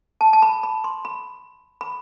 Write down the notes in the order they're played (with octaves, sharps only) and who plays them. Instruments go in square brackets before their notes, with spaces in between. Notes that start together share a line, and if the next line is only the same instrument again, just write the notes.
[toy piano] A5
A5
B5
B5
C6
B5
B5